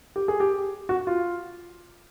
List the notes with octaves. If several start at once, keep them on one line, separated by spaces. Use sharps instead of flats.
G4
G#4
G4
F#4
F4